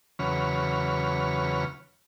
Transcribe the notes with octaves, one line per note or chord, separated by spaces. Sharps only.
E2 C#3 F#3 B4 C#5 F6